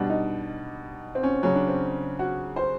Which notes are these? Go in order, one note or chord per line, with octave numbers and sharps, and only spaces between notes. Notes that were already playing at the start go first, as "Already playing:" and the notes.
Already playing: B2 G3 D4
D#4
C4
C#4
C#3 F#3 C#4
D4
C4
F#4
C5